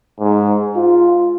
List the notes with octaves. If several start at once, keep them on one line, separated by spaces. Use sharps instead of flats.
G#2
F4